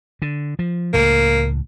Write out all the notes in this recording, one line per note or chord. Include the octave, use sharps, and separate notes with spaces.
D3
F3
C#2 A2 A#3